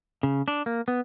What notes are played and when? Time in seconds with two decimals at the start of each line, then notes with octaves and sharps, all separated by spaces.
0.23 C#3
0.48 D4
0.66 A#3
0.88 B3